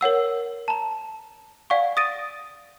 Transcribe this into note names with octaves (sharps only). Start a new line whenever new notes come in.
A#4 C#5 F#5 E6
A5 A#5
D5 F5 F#5 G#5 C#6
D#6 A6 A#6 D7 D#7